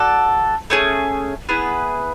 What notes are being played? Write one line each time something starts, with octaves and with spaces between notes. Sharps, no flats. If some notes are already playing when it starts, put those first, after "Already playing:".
Already playing: F#4 A4 D5
A3 C#4 G#4
B3 E4 G#4 B4